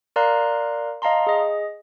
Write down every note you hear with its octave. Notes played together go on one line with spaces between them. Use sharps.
A#4 D5 F5 A#5 C6 F#6
D#5 F5 A5 A#5 C6
G#4 D#5